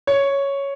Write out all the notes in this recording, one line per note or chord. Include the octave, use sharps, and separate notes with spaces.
C#5